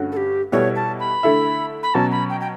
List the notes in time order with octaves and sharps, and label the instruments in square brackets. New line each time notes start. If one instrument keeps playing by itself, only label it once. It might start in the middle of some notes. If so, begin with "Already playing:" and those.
Already playing: [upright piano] G2 D3 A3 C#4 F#4
[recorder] A4
G4
[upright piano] B2 G3 B3 E4 A4 [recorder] C#5
[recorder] A5
B5
[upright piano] D3 A3 E4 A4 E5
[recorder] B5
[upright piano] B2 F#3 C#4 [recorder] A5
[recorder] B5
G5
G5